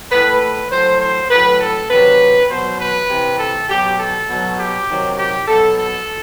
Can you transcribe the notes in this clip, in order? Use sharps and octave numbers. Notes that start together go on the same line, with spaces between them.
A2 E3 B4
B4
A2 F#3 C5
C5
A2 F#3 B4
A4
C3 D#3 F#3 B4
B2 F#3 C5
B4
C3 E3
A4
B2 F#3 G4
A4
B2 F#3
G4
C3 D#3 F#3
G4
B2 F#3 A4
A4